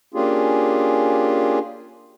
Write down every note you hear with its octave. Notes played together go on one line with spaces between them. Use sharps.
A#3 C#4 D4 F4 G4 G#4